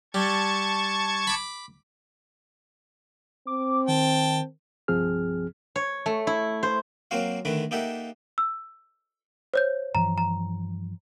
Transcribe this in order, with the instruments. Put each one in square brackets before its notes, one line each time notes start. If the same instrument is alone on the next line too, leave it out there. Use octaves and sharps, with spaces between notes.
[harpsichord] G3 [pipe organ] A5 C#6 G#6
[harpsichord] B5 D6
[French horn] C4 [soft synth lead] D6
[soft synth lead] D#3 [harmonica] G5 A5
[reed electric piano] C2 G2 F3 C4 G#4 F6
[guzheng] C#5
A3
E4
C5
[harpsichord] F#3 A#3 C4 F#4 F5
D3 D#3 A3 D4 B4
A#3 D#4 G4 A4 E5 F#5
[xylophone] E6
C5 C#5 G6
[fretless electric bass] G2 E3 F3 [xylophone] A#5
[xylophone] A#5